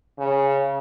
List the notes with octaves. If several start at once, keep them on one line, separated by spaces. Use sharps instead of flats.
C#3